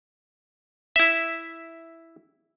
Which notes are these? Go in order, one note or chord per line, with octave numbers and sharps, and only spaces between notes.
E4 E5